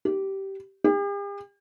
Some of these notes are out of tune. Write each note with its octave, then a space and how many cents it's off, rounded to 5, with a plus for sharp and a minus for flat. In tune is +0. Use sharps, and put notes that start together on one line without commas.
G4 -15
G4 +45